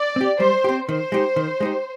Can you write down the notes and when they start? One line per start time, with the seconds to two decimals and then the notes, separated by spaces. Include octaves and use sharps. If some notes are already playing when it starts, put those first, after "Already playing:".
Already playing: D5
0.16 C4 G4
0.40 G3 C5
0.64 C4 G4
0.89 D#3 C5
1.12 G#3 D#4 G4
1.36 D#3
1.61 G#3 D#4 G4